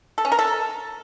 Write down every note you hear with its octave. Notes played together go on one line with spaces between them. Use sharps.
A4
C#4
A#4
A4